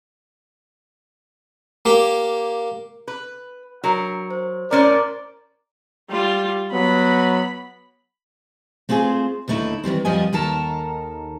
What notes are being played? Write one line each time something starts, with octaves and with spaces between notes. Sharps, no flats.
A#3 G4
B4
F#3 D4 A#4 C#7
C5
A2 C#4 A#4 C5 D5 A#5
G3 F4
F#3 B3 B5
A3 C4 F4 F#4 G#4 C5
D#2 D3 A3 D#4 E4
D#3 E3 G3 C4
F2 F3 G3 D#5 G#5
D#2 D#3 A4 A#4 A5